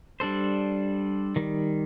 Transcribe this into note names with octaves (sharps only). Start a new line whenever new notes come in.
G3 D4 A4 C5
D#3 G3